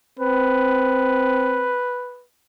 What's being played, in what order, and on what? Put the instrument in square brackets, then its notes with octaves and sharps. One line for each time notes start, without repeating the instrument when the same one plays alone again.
[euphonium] C4 [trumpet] B4